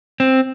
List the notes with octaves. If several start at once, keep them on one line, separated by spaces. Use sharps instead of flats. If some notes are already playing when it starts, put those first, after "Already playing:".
C4